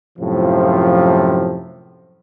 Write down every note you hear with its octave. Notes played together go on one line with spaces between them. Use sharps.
F#2 A2 C3 F3